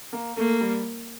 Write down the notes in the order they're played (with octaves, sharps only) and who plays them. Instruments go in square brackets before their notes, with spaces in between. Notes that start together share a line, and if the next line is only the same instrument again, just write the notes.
[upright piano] A#3
[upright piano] A3 [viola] A#3
[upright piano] G3